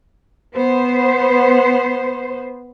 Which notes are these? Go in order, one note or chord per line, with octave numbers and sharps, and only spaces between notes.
B3 C5